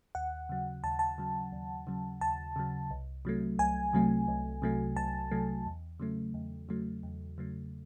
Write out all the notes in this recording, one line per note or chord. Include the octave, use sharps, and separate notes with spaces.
D#2 F#5
C#3 F#3
D#2 A5
A5
C#3 F#3
D#2
C#3 F#3
D#2 A5
C#3 F#3
C2
C3 F#3 A3
C2 G#5
C3 F#3 A3
C2
C3 F#3 A3
C2 A5
C3 F#3 A3
E2
C#3 F#3 A3
E2
C#3 F#3 A3
E2
C#3 F#3 A3